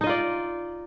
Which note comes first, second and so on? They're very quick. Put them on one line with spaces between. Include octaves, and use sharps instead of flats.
D#4 D#5 F4 D5